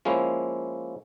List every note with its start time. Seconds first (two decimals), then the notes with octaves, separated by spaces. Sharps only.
0.05 F3 G#3 A#3 C#4 E4